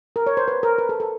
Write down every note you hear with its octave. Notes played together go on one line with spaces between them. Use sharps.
A#4
C#5
C5
B4
A#4
B4
A4
A4